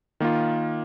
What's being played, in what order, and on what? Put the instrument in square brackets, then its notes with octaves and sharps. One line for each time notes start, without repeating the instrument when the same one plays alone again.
[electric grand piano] D#3 A#3 F4